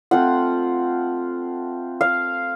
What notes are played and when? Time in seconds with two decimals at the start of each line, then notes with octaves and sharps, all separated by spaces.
0.11 A3 C4 F4 F#5
2.01 F5